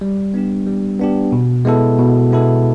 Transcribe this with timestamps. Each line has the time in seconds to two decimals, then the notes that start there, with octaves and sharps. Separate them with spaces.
0.01 G3
0.34 B3 D4 G4
0.67 G3
0.99 B3 D4 G4
1.32 B2
1.65 G#3 B3 E4 A4
1.98 B2
2.31 G#3 B3 E4 A4